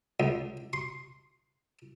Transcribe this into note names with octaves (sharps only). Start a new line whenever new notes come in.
C#2
C6